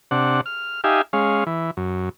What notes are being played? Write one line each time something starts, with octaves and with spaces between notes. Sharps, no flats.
C3 D4 F#5
F6
D#4 G4 E5 F5 G#5
G#3 C#4 F5
E3
F#2